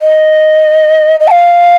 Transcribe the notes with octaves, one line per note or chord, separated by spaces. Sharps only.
D#5
D#5
A5
F5